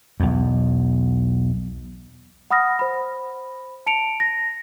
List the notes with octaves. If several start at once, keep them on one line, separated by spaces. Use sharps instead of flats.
B1 E2
F#5 B5 D#6 F6 A#6
C5 B5
A5 C#7 D7 F7
A#6